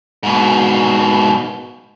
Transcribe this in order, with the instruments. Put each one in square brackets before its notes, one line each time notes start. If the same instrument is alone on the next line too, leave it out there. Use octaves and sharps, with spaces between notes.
[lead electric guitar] G#2 B2